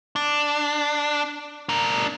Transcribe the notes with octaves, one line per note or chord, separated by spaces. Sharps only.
D4
D4 A#4